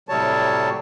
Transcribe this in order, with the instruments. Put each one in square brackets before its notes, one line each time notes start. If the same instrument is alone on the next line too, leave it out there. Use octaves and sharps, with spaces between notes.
[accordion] A2 C3 F#3 G3 C#5 A5